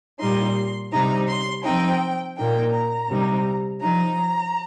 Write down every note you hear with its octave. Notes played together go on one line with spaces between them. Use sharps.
A#2 G3 D#4 C6
C3 G3 D#4 A#5
C6
F3 C4 D#4 G5
A#2 A#3 D#4 G5
A#5
C3 G3 D#4
F3 D#4 A#5